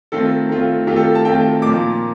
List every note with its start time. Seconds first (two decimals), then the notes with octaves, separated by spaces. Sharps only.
0.12 D#3 A3 C4 F4 A4
0.49 D#3 A3 C4 F4
0.87 D#3 A3 C4 F4 G4
0.96 A4
1.15 A5
1.25 D#3 A3 C4 F4 G5
1.62 A#2 F3 A#3 D#4 D6